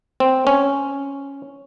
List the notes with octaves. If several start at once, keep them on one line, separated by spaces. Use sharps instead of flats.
C4
C#4